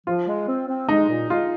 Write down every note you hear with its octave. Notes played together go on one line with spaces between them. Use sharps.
F3 F4
G#3
C4
C4
G#3 D#4
A#2
G#3 F4